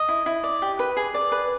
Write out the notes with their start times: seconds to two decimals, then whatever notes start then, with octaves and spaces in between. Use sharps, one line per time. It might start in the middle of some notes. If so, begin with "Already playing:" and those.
Already playing: D#5
0.08 E4
0.26 E4
0.43 D5
0.62 G4
0.79 B4
0.97 G#4
1.14 D5
1.32 B4